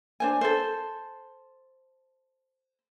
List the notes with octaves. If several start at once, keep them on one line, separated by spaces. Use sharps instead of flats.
D4 C5 G#5
A4 C5